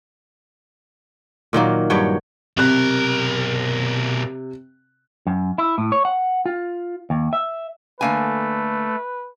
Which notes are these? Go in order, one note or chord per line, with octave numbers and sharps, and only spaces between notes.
A#2 D#3 F#3 A#3
G2 F#3 C#5 G5
B1 C3 A#4 F#6
F#2
E4
A2
C#5
F#5
F4
D#2
E5
D3 A3 A#3 B4 G#5